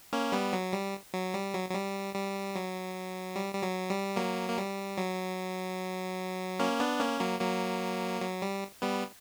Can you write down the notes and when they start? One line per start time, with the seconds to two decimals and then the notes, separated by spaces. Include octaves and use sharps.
0.13 A#3 C#4
0.32 G3 B3
0.53 F#3
0.73 G3
1.14 F#3
1.34 G3
1.54 F#3
1.69 F#3
1.74 G3
2.15 G3
2.55 F#3
3.36 G3
3.54 G3
3.63 F#3
3.90 G3
4.16 F#3 A#3
4.49 A#3
4.58 G3
4.98 F#3
6.59 A#3 C#4
6.80 B3 D4
7.00 A#3 C#4
7.20 F#3 A#3
7.40 F#3 A#3
8.22 F#3
8.42 G3
8.82 G3 B3